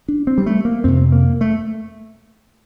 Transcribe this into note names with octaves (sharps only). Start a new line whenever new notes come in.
D4
C4
G3
A3
A#3
F2 C3 C4
A#3
A3